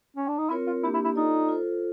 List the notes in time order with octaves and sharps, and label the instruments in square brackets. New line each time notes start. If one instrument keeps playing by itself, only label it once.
[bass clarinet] C#4
D4
D#4
[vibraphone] C4 F4 A#4 C#5 [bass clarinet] E4
[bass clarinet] F4
[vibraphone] A#3 D4 G4 [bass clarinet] E4
[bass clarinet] E4
E4
[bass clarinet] D#4 [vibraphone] F4 A4 D5
[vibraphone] F4 A4 C5